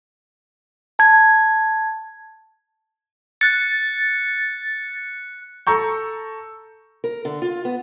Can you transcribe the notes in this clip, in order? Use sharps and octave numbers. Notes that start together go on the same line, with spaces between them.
A5 G#6
F#6 A6 C#7
A4 A#5 C#6 G6
A#4
D3
F4
B3